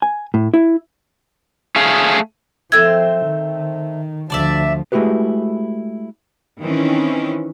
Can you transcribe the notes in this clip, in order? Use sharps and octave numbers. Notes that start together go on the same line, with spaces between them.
G#5
A2
E4
A3 G#4 F5
F3 A3 C4 A4 C5 E6 G#6
D#3
D2 F3 D4 D5 E5
G#3 A3 E4 F#4 G4 B4
D#3 E3 C4 C#4